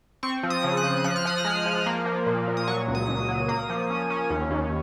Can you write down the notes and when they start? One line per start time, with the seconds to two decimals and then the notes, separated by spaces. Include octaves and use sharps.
0.23 C4 C#6
0.43 F3
0.50 D#6
0.64 C#3
0.77 F#6
0.84 F3
1.04 F3 F#6
1.16 F6
1.25 F3 D#6
1.38 F6
1.45 G#3
1.66 F3
1.86 A#3
2.06 F3
2.26 A#2
2.48 A#2
2.57 D#6
2.67 F#3 C#6
2.88 C#2
2.95 D#6
3.08 C#2
3.29 F#3
3.48 A#3 D#6
3.69 F3
3.90 C#4
4.10 C#4
4.30 D#2
4.51 D#2